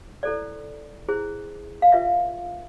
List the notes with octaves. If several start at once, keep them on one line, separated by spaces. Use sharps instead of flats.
E4 A4 C5 D5
E4 G#4 C5
F5
F4 B4 E5